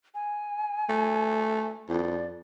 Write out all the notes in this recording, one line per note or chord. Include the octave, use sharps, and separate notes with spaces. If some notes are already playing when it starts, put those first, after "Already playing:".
G#5
A3
F2 D5